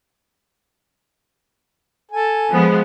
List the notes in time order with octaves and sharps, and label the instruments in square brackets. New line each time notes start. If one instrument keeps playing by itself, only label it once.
[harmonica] A4 G#5
[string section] F3 G#3 B3